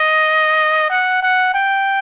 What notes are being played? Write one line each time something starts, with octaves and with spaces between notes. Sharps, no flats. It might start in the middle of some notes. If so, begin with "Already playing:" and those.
Already playing: D#5
F#5
F#5
G5